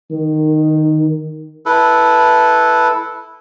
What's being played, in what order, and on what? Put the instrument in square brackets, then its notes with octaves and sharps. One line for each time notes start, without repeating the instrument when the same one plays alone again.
[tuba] D#3
[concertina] E4 A4 B4